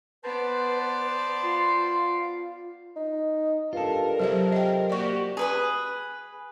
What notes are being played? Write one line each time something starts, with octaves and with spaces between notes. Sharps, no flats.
B3 B4 C5 D5 A5
F4 C6
D#4
G2 F4 A4 A#4
C3 F#3 G4 E5
D#5 G5
A#3 F#4 G4 D5 C#6
G#4 B4 D#6